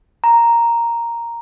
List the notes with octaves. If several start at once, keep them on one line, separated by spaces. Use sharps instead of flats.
A#5